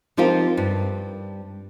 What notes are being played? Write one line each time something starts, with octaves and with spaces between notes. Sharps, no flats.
F3 C4 D#4 F4 G4 A#4
G2